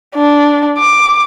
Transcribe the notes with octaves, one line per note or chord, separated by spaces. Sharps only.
D4
D6